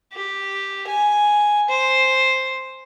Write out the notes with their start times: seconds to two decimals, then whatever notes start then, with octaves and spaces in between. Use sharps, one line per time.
0.13 G4
0.87 G#5
1.69 C5